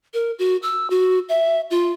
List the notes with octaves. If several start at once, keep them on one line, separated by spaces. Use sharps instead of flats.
A#4
F#4
E6
F#4
E5
F4